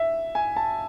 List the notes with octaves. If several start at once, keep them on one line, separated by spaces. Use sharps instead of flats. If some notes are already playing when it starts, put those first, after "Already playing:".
Already playing: E5
G#5
A5